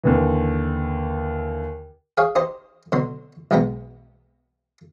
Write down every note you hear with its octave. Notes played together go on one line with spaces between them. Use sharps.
D#2 D3 E3
G#4 C#5 F5 G5
D#4 G4 C5 D#5
B2 D3 F#3 C6
B1 B2 G#3 B3 G5 A#5